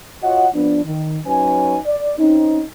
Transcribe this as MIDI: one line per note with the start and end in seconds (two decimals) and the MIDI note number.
0.23 0.47 65
0.23 0.47 66
0.23 0.47 73
0.23 0.47 75
0.23 0.47 78
0.54 0.82 53
0.54 0.82 59
0.54 0.82 62
0.85 1.18 51
1.26 1.79 54
1.26 1.79 61
1.26 1.79 63
1.26 1.79 71
1.26 1.79 80
1.86 2.12 74
2.18 2.62 60
2.18 2.62 61
2.18 2.62 63